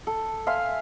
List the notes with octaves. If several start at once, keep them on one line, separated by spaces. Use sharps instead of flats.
A4
E5 F5 G#5 C6